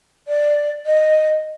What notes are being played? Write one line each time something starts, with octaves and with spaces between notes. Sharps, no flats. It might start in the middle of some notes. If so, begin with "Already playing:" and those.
D5
D#5